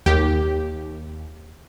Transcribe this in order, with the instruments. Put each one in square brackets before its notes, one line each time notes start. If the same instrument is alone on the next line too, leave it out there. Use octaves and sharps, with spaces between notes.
[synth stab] D#2 [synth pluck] G4